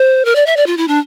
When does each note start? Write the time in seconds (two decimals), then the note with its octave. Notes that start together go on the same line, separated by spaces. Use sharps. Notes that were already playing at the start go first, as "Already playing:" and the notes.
Already playing: C5
0.25 A#4
0.35 D5
0.46 E5
0.56 D5
0.66 F4
0.77 E4
0.88 D4